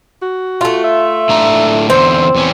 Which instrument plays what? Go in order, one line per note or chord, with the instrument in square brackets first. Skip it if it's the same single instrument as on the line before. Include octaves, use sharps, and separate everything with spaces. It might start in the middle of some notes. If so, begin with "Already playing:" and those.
[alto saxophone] F#4
[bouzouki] A3 F4
[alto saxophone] E5
[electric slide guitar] A2 D4 A#5
[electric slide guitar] E2 D3 [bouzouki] C4 [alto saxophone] C5
[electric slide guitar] E2 E3 C#4